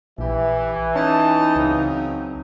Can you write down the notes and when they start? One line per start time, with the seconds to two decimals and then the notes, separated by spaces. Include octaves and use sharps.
0.18 A#1 E3 G4 E5
0.96 C#4 D#4 A5
1.56 C#2 C#3 F#3 C4